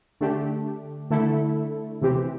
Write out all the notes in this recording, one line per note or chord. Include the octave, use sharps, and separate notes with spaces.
D3 A3 D4 G4
D3 A3 E4 A4
C3 E3 C4 G4